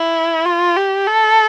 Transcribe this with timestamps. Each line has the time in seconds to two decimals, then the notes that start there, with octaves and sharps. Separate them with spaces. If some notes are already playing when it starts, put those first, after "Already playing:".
Already playing: E4
0.45 F4
0.76 G4
1.07 A4